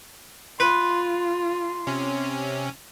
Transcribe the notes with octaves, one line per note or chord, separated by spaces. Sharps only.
F4 B4 C6
C6
C3 C#4